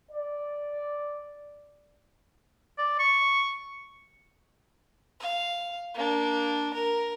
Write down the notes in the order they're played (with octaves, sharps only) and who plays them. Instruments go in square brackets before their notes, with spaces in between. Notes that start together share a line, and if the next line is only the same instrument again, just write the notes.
[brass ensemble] D5
[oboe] D5
C#6
[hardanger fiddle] F5
A#3 D4
A#4